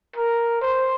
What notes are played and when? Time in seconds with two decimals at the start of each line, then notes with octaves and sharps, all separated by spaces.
0.16 A#4
0.61 C5